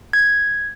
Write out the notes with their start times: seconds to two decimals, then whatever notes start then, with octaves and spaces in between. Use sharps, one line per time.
0.13 G#6